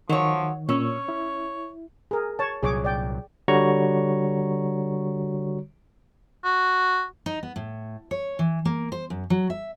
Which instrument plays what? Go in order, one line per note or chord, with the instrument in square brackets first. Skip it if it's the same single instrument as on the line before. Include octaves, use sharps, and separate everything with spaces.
[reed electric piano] D#3 [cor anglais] F3 [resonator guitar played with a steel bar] F#3 C#5
[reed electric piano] A#2 E6 [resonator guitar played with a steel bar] C#4 [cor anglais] C#5
[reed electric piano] E4
[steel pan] G#4 A#4
C#5 A5
[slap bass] C2 A#2 F#3 [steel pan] G#4 C#5 D6
[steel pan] D5 G5
[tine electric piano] D3 G3 F#4 C#5 A#5 C#6
[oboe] F#4
[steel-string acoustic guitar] D#4
B3
A2
C#5
E3
A#3
C5
F#2
F#3
E5